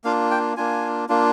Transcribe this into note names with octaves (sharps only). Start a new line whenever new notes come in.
A#3 D4 F4 F5
G5
A#3 D4 F4 G#5
A#3 D4 F4